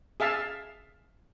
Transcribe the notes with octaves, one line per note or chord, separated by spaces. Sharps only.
G#4 E5 F5 A5